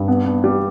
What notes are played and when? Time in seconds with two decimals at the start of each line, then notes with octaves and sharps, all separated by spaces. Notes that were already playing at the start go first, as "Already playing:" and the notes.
Already playing: G2
0.08 B3
0.26 B3
0.44 G3